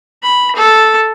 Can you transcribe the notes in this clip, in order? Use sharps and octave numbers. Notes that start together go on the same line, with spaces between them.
B5
A4